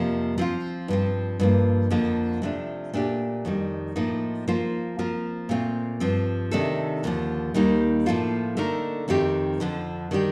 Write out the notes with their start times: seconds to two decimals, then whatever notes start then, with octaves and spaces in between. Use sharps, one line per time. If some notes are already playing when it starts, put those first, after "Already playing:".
Already playing: F2 C3 F3 A#3
0.38 F3 C4 F4
0.88 G2 F3 C4
1.40 G2 F3 A#3
1.90 F2 D3 F3 A#3
2.42 C3 F3 A3 D4
2.94 A#2 A3 D4 G4
3.45 F2 D#3 G3
3.96 A2 F3 A#3 D#4
4.48 F3 A#3 F4 C5
4.99 F3 C4 F4 A#4
5.49 A#2 A3 C4 F4
6.00 G2 F3 C4
6.51 C3 D#3 A3 D4 A4
7.04 D#2 D3 F3
7.54 D#2 D#3 G3 A#3 D#4
8.06 A2 F3 A#3 F4 A4
8.57 D3 A3 D#4 A#4
9.08 F2 D#3 A3 C4 G4
9.60 F2 D3 F3
10.11 D#3 G3 D4 G4